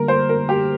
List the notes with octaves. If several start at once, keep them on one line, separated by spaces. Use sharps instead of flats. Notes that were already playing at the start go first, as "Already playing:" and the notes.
Already playing: D3 G3 A#3 A#4
C5
A#4
G4